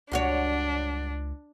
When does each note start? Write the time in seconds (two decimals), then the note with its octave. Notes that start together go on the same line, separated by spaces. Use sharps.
0.12 C#2 G2 D4 F#4 C#5